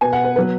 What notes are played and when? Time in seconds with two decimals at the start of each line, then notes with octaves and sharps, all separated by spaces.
0.01 B2 B3 G#5
0.13 F#5
0.25 B4
0.36 F#3 B3 B4